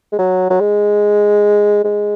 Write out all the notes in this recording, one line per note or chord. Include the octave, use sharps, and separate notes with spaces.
G#3
F#3
F#3
G#3
G#3